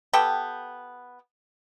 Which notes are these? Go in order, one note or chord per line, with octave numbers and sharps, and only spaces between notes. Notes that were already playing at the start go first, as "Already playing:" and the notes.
B3 G4 A4 G5